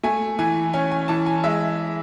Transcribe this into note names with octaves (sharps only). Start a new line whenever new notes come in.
A3 G#5
E3 G#5
C#4 G#5
G#5
E3 A5
G#5
G#3 E5